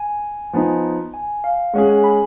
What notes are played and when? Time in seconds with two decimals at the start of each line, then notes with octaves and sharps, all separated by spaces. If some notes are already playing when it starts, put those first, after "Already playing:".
Already playing: G#5
0.53 F3 B3 D#4
1.14 G#5
1.44 F5
1.74 G#3 C#4 G#4 F#5
1.88 G#5
2.04 B5